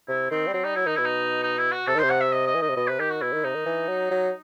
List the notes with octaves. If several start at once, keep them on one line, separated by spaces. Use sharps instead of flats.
C3 E4
D#3 C4
G3
F#3 C4
G3 D#4
F#3 E4
D#3 D#4
B2 E4
D#4
D#4
E4
F#4
C3 A4
D#3
C3 C5
F#5
E5
D#5
D#5
E3
D#3 D#5
C3
B2 D#5
C3 B4
D#3 G4
F#4
B2 E4
D#3
C3 D#4
D#3
E3
F#3
F#3